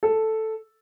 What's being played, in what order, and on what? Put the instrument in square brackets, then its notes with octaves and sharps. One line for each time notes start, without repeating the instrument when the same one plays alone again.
[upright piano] A4